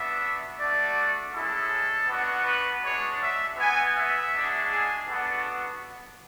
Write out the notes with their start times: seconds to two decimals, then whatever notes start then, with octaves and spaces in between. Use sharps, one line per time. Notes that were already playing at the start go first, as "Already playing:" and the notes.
Already playing: B3 D4 F#4 E5
0.58 A3 D4 F#4 D5
1.33 G#3 C#4 E4 A4
2.07 B3 D4 F#4
2.45 B4
2.82 G#3 D4 F#4 C#5
3.20 E5
3.57 B3 F#4 G#5
3.95 E5
4.32 G#3 D4 F#4
4.70 G#4
5.07 B3 D4 F#4 A4